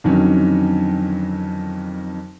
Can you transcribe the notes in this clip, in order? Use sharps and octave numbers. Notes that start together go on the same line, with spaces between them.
F2 D3 D#3 F#3 C#4